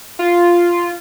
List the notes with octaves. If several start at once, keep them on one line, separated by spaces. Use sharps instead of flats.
F4